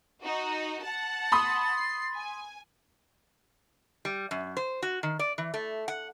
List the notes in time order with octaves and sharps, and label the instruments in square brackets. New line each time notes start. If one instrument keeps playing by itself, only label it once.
[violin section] D#4 F#4
[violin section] F#5 A5 [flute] A6
[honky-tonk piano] B5 C6 D#6
[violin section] C7
G#5
[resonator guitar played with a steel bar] G3
F#2
C5
F#4
D#3
D5
E3
A3
F#5